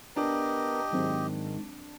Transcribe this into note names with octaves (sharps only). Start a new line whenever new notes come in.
B3 D4 G4 A#4 D#5
G#2 D#3 F#3 G#3 C4